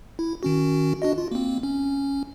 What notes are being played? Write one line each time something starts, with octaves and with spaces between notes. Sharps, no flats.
E4
D#3 C#4 F#4
D4 F#4 D#5
F4
A#3 C4
C#4